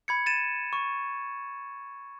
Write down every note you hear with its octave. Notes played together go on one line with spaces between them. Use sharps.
B5 G#6 C#7
A6 D#7 E7
C#6